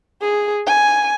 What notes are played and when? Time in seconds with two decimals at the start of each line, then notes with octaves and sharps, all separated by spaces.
0.22 G#4
0.67 G#5